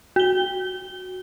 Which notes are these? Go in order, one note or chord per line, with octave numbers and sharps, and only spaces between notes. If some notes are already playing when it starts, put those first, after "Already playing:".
F#4 G7